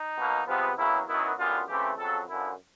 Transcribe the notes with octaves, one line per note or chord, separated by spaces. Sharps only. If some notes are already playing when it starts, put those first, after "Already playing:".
Already playing: D#4
B2 F#3 A#3
C3 F3 G#3 B3
E2 C#3 F#3 A#3 E4
F#2 D#3 F#3 B3 E4
F#2 D3 G3 B3 F4
C#3 E3 A3 C4 G4
F2 C#3 F#3 A4
F#2 D3 F3 E4